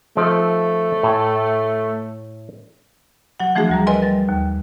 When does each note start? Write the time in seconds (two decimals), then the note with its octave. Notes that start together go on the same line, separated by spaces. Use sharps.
0.17 F3 A3 C4 D#4
1.03 A2 G#5
3.40 F#3 F#5
3.55 E3 F3 A3 D4 F#4 G#4
3.69 D2 G3 A#5
3.87 A#4 B4 D#5 G#5 C6
4.02 D2 G3 A6
4.29 D#2